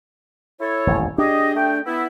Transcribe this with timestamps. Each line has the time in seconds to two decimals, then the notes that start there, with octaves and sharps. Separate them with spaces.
0.60 E4 A4 C#5
0.87 D#1 A1 F2
1.18 D4 G4 G#4 D#5
1.55 A3 G5
1.85 B3 E4